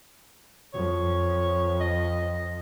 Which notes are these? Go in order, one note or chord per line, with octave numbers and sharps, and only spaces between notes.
F2 C#5
D#5